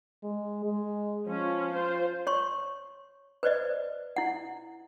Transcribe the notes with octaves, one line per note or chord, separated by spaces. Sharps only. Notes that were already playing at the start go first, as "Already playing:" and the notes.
G#3
G#3
F3 C#4 F4
F4 C5
C#5 C6 C#6
B4 C5 D5 D#5
E4 F#5